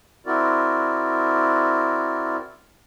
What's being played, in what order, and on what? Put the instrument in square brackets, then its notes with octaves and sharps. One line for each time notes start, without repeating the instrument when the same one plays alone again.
[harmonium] C4 E4 F#4 A#4 D5